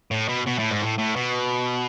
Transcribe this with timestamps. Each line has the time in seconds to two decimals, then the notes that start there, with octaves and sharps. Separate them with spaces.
0.11 A2
0.28 B2
0.46 B2
0.58 A2
0.71 G#2
0.82 A2
0.98 A2
1.16 B2